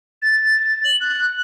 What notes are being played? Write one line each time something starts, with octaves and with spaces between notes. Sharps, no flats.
A6
A6
F#7
F#6